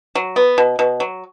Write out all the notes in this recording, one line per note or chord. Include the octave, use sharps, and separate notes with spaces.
F#3
B3
B2
B2
F#3